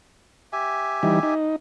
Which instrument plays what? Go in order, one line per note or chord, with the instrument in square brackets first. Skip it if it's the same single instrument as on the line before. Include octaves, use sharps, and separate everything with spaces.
[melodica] G4 E5 G#5
[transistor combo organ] E3 G3 D#4
D#4